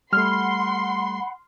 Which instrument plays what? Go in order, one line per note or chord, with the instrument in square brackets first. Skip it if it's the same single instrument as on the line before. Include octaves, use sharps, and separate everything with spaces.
[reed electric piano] G3 A3 [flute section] F#5 B5 [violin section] C6 [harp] F6